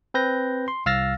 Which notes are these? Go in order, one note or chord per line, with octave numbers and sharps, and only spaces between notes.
C4 B4 G6 A#6
C6
C2 F5 E6 F6 A6 A#6